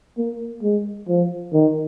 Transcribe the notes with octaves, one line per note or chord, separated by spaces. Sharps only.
A#3
G#3
F3
D#3